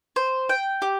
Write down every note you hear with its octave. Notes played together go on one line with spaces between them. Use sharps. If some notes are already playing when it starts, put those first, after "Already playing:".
C5
G5
G4